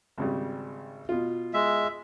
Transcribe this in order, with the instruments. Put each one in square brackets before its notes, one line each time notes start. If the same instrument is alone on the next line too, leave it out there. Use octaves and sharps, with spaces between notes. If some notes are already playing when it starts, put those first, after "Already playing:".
[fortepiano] G#1 C#3 G3
B2 F4
[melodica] G#3 E5